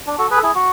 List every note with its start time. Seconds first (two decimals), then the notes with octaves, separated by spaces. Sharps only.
0.07 D4
0.18 F#4 A4
0.30 G#4 B4
0.37 A4
0.43 E4 G#4
0.55 F#4